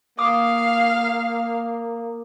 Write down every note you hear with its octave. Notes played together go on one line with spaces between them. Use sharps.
A#3 F5 D6 D#6